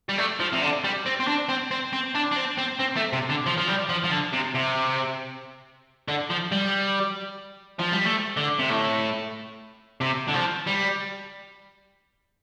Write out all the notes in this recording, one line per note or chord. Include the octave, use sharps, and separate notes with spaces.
G3
A3
F3
C3
D3
G3
C4
C4
D4
C4
C4
C4
D4
D4
C4
C4
C4
A3
C3
D3
F3
F3
G3
F3
F3
D3
C3
C3
D3
F3
G3
F3
G3
A3
D3
C3
A2
C3
D3
F3
G3